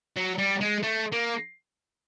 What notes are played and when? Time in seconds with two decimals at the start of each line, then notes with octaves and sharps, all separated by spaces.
0.16 F#3
0.38 G3
0.61 G#3
0.83 A3
1.12 A#3